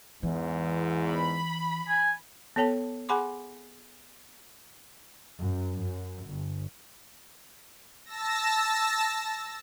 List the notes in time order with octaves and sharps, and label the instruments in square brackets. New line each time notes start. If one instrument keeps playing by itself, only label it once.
[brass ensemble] E2 G#2 [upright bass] E3
[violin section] B5
[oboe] G#5
[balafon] B3 A4 C#5 G5 A5
G#4 F#5 G#5 B5 C6 D6
[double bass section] F#2
F#2
G1
[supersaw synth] A5 E6 A#6